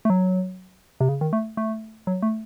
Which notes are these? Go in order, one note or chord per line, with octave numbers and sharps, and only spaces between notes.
A3
F#3
C3
C#3
D#3
A3
A3
F#3
A3